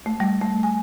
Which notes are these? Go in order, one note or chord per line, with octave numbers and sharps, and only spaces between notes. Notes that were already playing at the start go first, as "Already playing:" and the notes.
A3
G3
A3
G#5